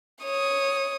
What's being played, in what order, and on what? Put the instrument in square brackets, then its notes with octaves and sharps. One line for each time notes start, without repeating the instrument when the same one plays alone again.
[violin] C#5 D#6